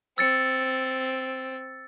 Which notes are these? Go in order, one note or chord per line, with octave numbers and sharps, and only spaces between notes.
C4 E6 A6 C#7